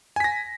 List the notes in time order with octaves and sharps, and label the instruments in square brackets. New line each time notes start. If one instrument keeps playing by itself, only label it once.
[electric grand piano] G#5
B6
A#6